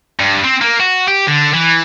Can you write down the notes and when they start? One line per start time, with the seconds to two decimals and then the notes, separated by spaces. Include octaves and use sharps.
0.19 G2
0.44 C4
0.61 A#3
0.80 F#4
1.08 G4
1.27 D3
1.54 E3